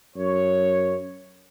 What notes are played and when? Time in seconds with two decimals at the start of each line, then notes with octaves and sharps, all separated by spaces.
0.17 F#2 C#5